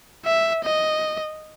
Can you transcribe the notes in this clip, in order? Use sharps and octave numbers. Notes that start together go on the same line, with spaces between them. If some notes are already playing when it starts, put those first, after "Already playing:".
E5
D#5